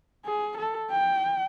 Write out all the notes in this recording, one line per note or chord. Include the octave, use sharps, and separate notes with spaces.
G#4
A4
G5